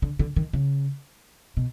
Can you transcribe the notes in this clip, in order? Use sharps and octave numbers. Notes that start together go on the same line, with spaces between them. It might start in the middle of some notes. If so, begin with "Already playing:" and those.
D3
D3
D#3
C#3
B2